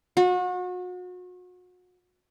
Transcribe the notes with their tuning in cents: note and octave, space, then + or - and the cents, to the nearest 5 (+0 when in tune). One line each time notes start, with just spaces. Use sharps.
F#4 -35